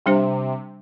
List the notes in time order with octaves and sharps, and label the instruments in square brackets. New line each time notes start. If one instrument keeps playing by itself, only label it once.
[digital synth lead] C3 [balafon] G3 D4 G4 C5